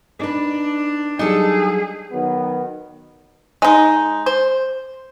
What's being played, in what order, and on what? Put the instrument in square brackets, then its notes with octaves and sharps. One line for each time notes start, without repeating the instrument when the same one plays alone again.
[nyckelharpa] D4 [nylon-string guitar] D#4 B4
[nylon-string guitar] F#3 G3 [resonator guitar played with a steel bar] D#4 A4 [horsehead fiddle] G#4
[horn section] D#3 F#3 B3
[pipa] G#3 D#4
C5